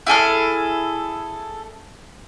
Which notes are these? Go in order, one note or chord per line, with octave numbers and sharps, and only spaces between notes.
E4 G#4 A4 F6